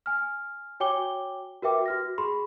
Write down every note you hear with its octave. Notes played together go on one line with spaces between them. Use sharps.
G#5 F6
F#4 C#5 G5 G#5 D6 G7
F#4 A#4 B4 E5 G5 D6
F#4 F6 A#6
G#4 B5 C6